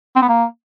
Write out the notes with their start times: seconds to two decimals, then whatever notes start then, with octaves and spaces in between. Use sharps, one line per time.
0.16 C4
0.22 B3
0.28 A#3